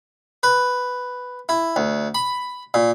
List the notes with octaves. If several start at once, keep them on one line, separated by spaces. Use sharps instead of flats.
B4
E4
D2
B5
A#2